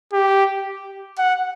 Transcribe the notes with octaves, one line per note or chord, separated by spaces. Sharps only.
G4
F#5